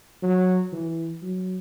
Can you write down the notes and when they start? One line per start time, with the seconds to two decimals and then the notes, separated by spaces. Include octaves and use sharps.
0.23 F#3
0.73 E3
1.22 F#3